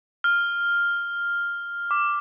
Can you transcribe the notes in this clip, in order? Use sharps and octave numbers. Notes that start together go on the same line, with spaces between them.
F6
D6